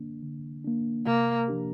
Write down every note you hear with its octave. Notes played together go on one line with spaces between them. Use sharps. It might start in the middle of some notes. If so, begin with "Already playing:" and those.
Already playing: D3 A#3 D4
D3
A#3 D4
C3 A#3
F3 A#3 D4 G4